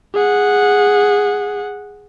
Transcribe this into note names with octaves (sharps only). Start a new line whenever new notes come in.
G#4 F#5